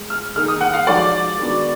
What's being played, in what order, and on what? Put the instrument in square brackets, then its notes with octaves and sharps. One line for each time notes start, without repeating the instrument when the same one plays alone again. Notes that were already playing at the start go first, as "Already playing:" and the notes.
Already playing: [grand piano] G#3
[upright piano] F6
[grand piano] D#3 A#3 D#4 G#4 [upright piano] F6
[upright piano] D#6
F#5
F5
[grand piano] F3 G#3 D#4 F#4 [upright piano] D5
[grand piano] D#3 G#3 B3 D4 F#4